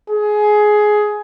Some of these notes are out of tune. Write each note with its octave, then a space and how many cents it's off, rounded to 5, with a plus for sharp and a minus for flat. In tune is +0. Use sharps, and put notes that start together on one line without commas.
G#4 +15